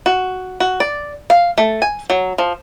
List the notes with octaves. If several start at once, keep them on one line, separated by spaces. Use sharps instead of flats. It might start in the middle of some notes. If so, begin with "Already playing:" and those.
F#4
F#4
D5
F5
A3
G#5
F#3
F3